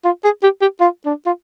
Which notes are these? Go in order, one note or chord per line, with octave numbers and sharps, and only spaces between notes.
F4
G#4
G4
G4
F4
D4
F4